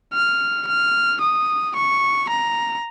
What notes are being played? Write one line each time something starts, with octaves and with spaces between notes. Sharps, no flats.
F6
F6
D#6
C#6
A#5